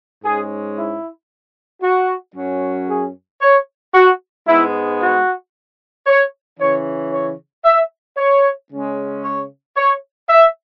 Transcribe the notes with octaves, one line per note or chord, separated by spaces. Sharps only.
G#2 G#3 C#4 G#4
E4
F#4
F#2 F#3 C#4
G#4
C#5
F#4
G#2 G#3 B3 E4
F#4
C#5
C#3 E3 C#4 C#5
C#5
E5
C#5
C#3 G#3 C#4
C#5
C#5
E5